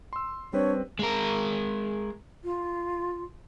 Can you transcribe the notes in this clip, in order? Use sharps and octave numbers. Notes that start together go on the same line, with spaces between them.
C6 E6
G3 C4 D4 B4 C#5
G#3 A#4
F4